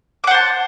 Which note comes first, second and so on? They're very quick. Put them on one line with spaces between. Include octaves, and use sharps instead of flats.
D6 F#5 C5 A5